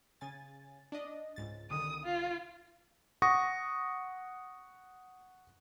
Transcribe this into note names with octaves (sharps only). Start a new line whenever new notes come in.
C#3 G#5 A6
D4 D5 D#5
C#2 G#2 A6
C2 D3 D#3 D#6
F4
F#5 C#6 D#6 A#6